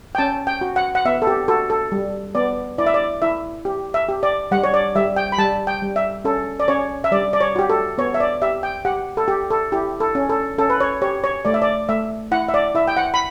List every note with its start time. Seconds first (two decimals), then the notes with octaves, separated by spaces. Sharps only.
0.15 G5
0.18 C#4 A5
0.47 G5
0.61 F#4
0.76 F#5
0.95 F#5
1.05 B3 E5
1.22 A4
1.27 G4
1.48 F#4 A4
1.70 A4
1.92 G3
2.35 B3 D5
2.78 E4 D5
2.86 E5
2.94 D5
3.22 E4 E5
3.65 G4
3.94 E5
4.09 G4
4.23 D5
4.51 G3 F#5
4.64 C#5
4.74 D5
4.95 G3 E5
5.16 G5
5.32 B5
5.38 G3 A5
5.67 G5
5.82 G3
5.96 E5
6.24 C#4 A4
6.60 D5
6.68 C#4 C#5
7.04 E5
7.12 G3 D5
7.33 D5
7.41 C#5
7.56 F#4 G4
7.70 A4
7.98 B3 C#5
8.14 E5
8.20 D5
8.42 G4 E5
8.63 G5
8.85 G4 F#5
9.17 A4
9.28 G4
9.50 A4
9.72 E4 G4
10.00 A4
10.15 C#4
10.29 A4
10.58 C#4 A4
10.70 B4
10.81 C#5
11.02 G4 C#5
11.24 C#5
11.45 A3 D5
11.54 E5
11.62 D5
11.89 A3 E5
12.31 E4 F#5
12.49 E5
12.54 D5
12.75 E4 E5
12.88 G5
12.97 F#5
13.14 B5